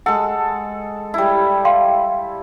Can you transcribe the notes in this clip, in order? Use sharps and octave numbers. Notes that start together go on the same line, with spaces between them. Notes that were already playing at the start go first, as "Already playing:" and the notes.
G#3 A4 F#5
G3 E4
F5 G5 C6